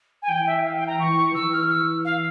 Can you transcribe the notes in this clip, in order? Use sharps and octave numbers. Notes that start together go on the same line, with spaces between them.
G#5
E3 G5
E5
F5
G5
A#5
E3 C#6
E3 E6
F6
E6
F5